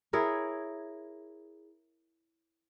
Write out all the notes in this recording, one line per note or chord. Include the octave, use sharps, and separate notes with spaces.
E4 G#4 A#4 C#5